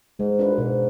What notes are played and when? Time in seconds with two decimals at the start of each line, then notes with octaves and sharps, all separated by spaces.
0.19 G#2 G#3
0.39 D4 F4 B4
0.52 F#2
0.58 G#2 B2